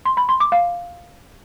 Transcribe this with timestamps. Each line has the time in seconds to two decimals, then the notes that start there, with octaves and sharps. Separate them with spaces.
0.05 C6
0.17 B5
0.29 C6
0.40 D6
0.52 F5